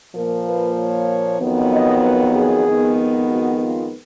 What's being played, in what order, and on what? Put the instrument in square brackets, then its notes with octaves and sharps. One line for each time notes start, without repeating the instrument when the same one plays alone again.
[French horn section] A#2 F3 A#3 A#4
B4
C#5
F2 D#3 F#3 B3
D#5
B4
G#4
F2 D#3 G#3 B3
F#4
F4